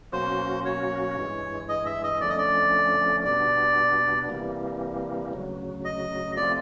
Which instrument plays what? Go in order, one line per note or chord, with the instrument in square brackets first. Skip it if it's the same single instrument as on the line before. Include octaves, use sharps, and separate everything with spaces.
[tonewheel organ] B2 F#3 A#3 C#4 F#4 [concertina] C5
[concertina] C#5
[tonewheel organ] G2 E3 G#3
[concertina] D#5
E5
D#5
[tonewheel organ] F2 D3 F3 A3 C#4 [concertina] D5
[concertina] D#5
D5
[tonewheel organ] B2 G3 B3 D4 [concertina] D5
[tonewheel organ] C3 E3 G3 A#3
D2 C#3 F#3
[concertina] D#5
[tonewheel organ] C3 F3 A3 C4 F4 [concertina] D5